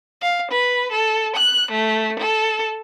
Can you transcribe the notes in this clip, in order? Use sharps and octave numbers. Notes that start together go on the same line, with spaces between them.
F5
B4
A4
F#6
A3
A4